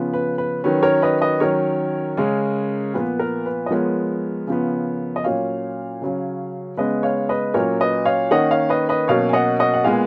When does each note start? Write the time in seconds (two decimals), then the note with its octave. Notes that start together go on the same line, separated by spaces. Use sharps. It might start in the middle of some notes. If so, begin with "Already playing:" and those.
Already playing: C#3 F3 B3
0.13 B4
0.38 B4
0.64 D#3 F#3 C#4 B4
0.83 A#4 C#5
1.02 B4 D#5
1.21 B4 D#5
1.40 D#3 F#3 C#4 A#4 C#5
2.17 C#3 G#3 C#4
2.94 A#2 F3 B3 B4
3.19 A#4
3.46 B4
3.66 D#5
3.70 F3 G#3 B3 A#4 C#5
4.47 C#3 F3 B3
5.16 D#5
5.24 A#2 F#3 C#4 C#5 F5
6.02 C#3 F#3 C#4
6.77 C#3 G#3 B3 B4 D#5
7.03 C#5 F5
7.29 B4 D#5
7.54 A#2 F#3 C#4 A#4 C#5
7.81 B4 D#5
8.05 C#5 F5
8.31 D#3 A#3 C#4 D#5 F#5
8.51 C#5 F5
8.69 B4 D#5
8.89 B4 D#5
9.08 B2 F#3 A#3 C#4 C#5 F5
9.29 G#5
9.33 D#5 F#5
9.59 D#5 F#5
9.74 F#5
9.84 A#2 G#3 B3 F5 G#5